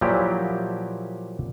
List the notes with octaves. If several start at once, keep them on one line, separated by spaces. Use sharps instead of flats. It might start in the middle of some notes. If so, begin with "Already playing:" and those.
A#2 F3 F#3 E4 G4